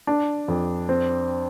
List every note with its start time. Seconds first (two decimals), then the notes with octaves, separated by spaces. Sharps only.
0.07 D4
0.48 F2
0.89 C4